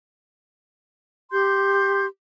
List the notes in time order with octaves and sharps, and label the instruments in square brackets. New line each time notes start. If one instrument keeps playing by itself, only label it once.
[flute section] G4 C6 G6